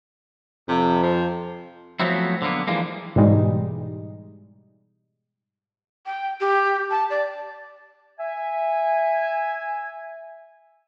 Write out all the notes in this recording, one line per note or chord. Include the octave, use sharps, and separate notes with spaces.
F2 C3
F3
F3 F#3 A3 B3 C4 E4
D3 A#3 B3
E3 F3 G3 G#3 A#3
G#2 B2 E3 G3 G#3 D#4
G5
G4
A5
D5
E5 G#5